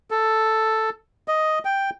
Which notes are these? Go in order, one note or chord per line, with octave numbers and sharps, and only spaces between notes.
A4
D#5
G5